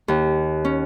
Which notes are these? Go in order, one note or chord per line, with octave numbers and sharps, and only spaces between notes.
D#2
C#4